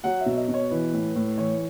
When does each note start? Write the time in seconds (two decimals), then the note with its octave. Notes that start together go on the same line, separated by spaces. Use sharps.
0.04 F#3 F#5
0.21 E5
0.26 B2
0.37 D#5
0.49 B2
0.54 C#5
0.71 E3 B4
0.93 A2
1.15 A2
1.38 E3 C#5